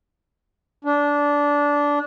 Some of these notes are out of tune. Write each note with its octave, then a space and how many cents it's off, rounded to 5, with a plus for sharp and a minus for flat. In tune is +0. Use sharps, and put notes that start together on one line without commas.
D4 -15